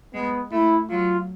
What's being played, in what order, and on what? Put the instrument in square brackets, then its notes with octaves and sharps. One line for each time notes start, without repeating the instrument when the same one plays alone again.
[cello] G#3 [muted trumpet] B3
[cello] A3 [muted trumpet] E4
[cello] F#3 [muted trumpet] F4